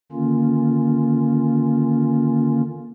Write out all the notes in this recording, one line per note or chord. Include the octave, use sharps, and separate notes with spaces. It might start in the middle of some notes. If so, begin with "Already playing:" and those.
D3 D#3 A#3 C#4 F4